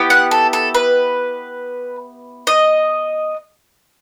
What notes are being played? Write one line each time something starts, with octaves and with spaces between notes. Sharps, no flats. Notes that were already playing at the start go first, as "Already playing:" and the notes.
Already playing: B3 E4 G4
F#5
A4
A4
B4
D#5